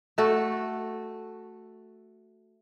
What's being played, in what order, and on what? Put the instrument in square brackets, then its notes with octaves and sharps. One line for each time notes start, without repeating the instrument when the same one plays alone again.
[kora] A3 F#4 A4